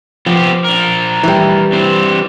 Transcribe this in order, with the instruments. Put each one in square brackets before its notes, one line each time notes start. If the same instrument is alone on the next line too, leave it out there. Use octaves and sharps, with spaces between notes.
[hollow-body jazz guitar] F3 [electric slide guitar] B3 C4 G4
[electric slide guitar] D4 A#4
[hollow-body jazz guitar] E3 G3
[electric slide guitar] C4 D4 C5